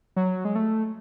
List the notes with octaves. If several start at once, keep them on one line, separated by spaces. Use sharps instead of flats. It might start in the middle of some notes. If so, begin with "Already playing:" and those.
F#3
G#3
A3